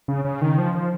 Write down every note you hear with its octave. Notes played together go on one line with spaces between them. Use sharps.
C#3
C#3
D#3
F3
F3